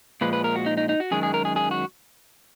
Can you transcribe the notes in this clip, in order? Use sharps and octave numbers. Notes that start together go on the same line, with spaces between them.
A#2 F3 G#3 B4
B4
A#4
F#4
D#4
D#4
D#4
F#4
F#2 D#3 G#3 G#4
G#4
A#4
G#4
G#4
F#4